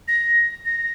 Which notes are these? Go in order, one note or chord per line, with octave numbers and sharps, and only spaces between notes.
A#6
A#6